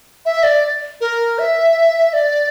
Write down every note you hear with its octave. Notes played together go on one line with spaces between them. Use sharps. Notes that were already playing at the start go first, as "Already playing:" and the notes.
E5
D5
A#4
E5
D5